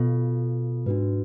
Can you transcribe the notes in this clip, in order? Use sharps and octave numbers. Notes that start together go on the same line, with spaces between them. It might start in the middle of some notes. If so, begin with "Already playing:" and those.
Already playing: B2 B3 F4 A4
G#2 D4 F#4 B4